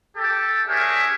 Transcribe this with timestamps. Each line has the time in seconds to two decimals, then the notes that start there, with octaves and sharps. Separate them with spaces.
0.16 G4 A4 A5
0.67 D4 G4 G#4 A#4 C#5 E5